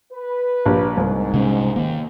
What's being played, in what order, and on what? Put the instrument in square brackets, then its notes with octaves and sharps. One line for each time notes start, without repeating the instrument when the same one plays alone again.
[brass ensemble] B4
[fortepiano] A#1 G4
[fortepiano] C2 [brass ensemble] G#2
[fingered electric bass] C3 G#3 C#4
D#3 A#3